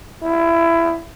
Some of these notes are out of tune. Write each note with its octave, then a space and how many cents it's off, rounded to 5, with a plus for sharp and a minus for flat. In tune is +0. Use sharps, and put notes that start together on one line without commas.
E4 +20